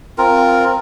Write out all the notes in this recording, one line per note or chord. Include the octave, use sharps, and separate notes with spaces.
C4 F4 A#4